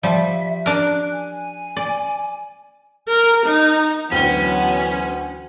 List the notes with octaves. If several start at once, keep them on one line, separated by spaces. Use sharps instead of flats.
F3 G3 E5
D4 A#4 F#6
G#5
D5
A#4
D#4
D2 E3 F#3 B3 C#4 G5 G7